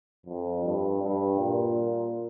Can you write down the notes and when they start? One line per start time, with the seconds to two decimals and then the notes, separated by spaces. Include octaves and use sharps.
0.26 F2
0.64 G2
1.02 G2
1.39 A#2